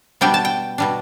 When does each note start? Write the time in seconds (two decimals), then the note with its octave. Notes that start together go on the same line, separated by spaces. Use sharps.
0.21 B2 G3 B3 D4 G5
0.34 A5
0.45 G5
0.78 B2 G3 D4